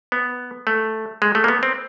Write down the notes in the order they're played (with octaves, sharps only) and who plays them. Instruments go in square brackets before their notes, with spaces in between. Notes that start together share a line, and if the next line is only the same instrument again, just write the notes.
[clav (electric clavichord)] B3
A3
G#3
A3
A#3
B3
C4